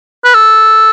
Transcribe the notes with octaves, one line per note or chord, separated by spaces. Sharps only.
B4
A4